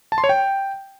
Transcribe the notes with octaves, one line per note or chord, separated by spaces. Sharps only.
A5
C6
C#5
G5